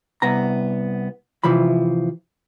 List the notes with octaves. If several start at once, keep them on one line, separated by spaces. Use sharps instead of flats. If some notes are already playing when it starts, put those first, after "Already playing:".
C2 B3 A#5
C3 E3 F3 B5